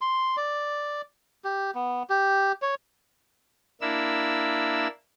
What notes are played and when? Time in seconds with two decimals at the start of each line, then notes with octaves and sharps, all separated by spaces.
0.01 C6
0.37 D5
1.44 G4
1.75 B3
2.10 G4
2.62 C#5
3.81 A#3 D4 E4 E6